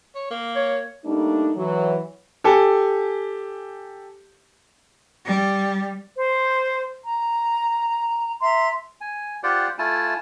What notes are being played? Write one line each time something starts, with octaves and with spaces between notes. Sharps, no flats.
C#5
A#3
C#5
G3 A3 A#3 D4 D#4
E3 F#3
G4 A4 G#5
G3
C5
A#5
E5 A#5 C6
G#5
F4 G4 C5 D5 F#5 G5
A3 E4 F4 G#5 A5